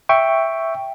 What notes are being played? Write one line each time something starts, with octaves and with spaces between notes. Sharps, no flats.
E5 G5 C#6